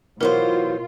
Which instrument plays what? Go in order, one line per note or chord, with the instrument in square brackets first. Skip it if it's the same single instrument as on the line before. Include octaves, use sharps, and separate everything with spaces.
[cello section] B2 F4 [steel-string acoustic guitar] E3 F#3 C5 [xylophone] A#4